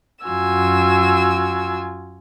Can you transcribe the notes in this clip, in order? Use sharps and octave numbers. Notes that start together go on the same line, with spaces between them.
F#2 F4 F#4 G#5 E6